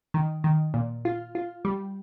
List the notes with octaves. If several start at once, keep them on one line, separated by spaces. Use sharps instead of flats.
D#3
D#3
A#2
F4
F4
G3